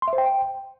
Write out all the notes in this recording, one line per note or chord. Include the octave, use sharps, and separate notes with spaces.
C6
E5
C5
G5